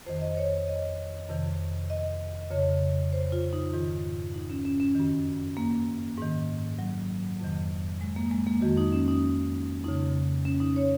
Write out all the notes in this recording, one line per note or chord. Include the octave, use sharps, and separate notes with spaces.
F2 D#3 C5
D#5
C#5
D#5
F2 C3 D#3
D#5
F2 C#3 C#5
C5
F4
D#4
G#2 D#3 F4
D#4
C#4
C#4
C#4
F#2 D#3
A#3
G#2 D#3
F#3
F2 C3 D#3
G#3
A#3
G#3
A#3
F2 D#3 F#4
D#4
C#4
D#4
F2 C#3 D#4
C#4
D#4
C#5